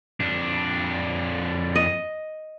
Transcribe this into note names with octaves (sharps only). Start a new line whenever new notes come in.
F2 D4
D#5